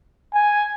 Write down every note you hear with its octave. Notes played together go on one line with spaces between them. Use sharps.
G#5